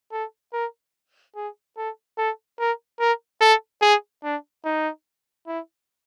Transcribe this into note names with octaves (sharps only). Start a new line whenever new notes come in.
A4
A#4
G#4
A4
A4
A#4
A#4
A4
G#4
D4
D#4
E4